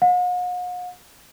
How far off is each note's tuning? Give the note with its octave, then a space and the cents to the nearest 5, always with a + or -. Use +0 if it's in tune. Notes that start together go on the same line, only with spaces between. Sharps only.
F#5 -45